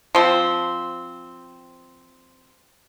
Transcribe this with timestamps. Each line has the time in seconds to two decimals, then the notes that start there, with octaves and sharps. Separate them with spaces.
0.15 F3 C4